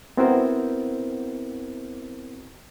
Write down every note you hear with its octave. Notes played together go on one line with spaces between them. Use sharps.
B3 C4 E4 F#4 A#4 C5